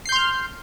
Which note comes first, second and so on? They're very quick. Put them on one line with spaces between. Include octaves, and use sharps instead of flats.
C7 G6 C6 F6